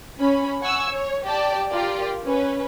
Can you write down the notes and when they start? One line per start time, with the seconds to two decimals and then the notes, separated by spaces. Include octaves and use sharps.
0.20 C#4 B5
0.62 F#5 G#5 C#6 E6
0.90 C#5
1.24 G4 D5 G5 A5
1.68 F4 G4 A#4 D5
2.25 C#4 B4